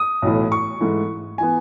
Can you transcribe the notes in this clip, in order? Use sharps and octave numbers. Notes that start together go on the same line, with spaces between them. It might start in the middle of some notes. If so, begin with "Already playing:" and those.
Already playing: D#6
B1 A2 E3
C#6
G#2 E3 A3
E3 B3 G#5